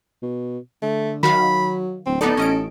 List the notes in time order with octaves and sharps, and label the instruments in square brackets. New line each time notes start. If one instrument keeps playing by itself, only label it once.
[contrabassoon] B2
[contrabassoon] D3 [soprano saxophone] A3
[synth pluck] D#3 F#4 F5 [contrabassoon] F#3 [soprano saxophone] B5
[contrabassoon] D1 [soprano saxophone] C4
[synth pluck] B3 D#4 D5 [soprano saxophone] A4
[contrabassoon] A1 [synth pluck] C#4 D#5 D7